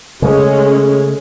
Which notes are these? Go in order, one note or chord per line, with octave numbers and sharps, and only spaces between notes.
C#3 G#3 A3 C#4